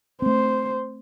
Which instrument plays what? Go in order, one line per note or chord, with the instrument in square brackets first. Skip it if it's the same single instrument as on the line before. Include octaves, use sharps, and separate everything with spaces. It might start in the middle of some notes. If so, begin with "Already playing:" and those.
[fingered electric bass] A3 C4 [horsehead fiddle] C5